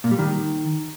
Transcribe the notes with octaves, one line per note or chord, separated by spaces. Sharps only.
A#2
G3
D#3